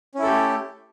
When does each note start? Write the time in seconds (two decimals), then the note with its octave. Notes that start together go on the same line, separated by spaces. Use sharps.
0.15 C#4
0.19 E4
0.23 A4
0.26 G4
0.30 A3